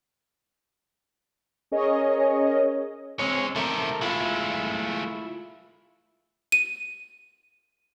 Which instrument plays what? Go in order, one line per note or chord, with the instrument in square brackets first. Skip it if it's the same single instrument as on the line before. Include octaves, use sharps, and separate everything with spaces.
[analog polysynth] C#4 G#4 A#4 C#5 D#5
[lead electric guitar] G#3 C#4 [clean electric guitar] C4 C#5
[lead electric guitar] C3 D#3 [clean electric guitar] A4 A#4 E5
[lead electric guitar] G#3 A3 [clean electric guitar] E4 F4
[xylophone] D#7